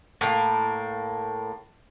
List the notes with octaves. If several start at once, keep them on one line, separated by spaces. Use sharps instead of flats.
A2 A#3